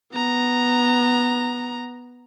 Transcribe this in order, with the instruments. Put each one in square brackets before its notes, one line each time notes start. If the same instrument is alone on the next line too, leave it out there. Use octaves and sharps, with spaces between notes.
[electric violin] B3 A#5